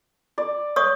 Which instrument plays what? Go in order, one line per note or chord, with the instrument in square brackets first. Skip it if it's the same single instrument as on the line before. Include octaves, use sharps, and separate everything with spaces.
[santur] D5
[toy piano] C#5 C#6 D#6